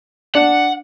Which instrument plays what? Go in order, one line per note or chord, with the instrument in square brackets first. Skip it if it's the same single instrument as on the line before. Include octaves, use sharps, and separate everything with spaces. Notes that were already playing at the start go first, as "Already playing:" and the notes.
[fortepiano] D4 [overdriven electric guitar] F#5